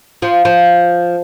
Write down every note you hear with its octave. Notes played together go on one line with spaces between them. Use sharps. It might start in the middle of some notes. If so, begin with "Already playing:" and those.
F3
F3